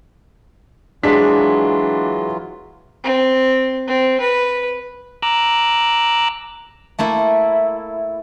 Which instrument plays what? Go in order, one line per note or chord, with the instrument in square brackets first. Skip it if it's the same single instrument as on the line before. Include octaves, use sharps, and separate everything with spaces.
[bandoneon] E3 F#3 F4 [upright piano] G#3 B6 [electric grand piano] D4
[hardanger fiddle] C4
C4
B4
[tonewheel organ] A#5 D6 E6 F#6
[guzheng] A3 A#3 E4